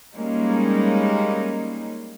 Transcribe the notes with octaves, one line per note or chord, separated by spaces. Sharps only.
G3 G#3 A#3 C#4 D#4